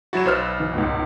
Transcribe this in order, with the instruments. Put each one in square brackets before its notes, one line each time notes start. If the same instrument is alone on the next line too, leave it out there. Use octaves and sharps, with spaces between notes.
[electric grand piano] F#3 E4 F#4 [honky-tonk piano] A6 E7
[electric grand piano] B1 F6 [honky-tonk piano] B4 C5 E6
[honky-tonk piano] E3
C#2 G#2 B2